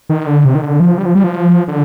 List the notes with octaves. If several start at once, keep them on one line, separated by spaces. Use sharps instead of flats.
D#3
D3
C3
D#3
D3
F3
G3
F3
G3
F3
D3